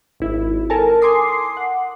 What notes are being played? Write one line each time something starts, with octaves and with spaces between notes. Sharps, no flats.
G#1 E4
A4 A#4 G#5 A5
G#5 C6 D6 D#6 C7
F#5